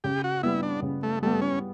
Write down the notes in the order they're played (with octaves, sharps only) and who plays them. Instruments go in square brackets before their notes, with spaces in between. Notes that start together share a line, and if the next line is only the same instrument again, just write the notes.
[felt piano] C#3 [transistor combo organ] G4
[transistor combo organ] F#4
[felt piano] G3 B3 [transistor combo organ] E4
[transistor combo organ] D4
[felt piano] C#3
[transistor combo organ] A3
[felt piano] G3 B3 [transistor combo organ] A3
[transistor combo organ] C#4